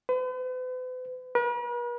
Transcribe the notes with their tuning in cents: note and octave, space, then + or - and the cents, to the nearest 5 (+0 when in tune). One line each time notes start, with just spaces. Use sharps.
B4 +45
B4 -45